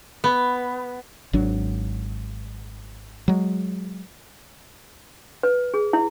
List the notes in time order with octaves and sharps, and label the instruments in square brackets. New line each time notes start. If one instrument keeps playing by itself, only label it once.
[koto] B3
[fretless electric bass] G#1 F#3 D4
F#3 G#3
[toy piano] B4
G#4
E4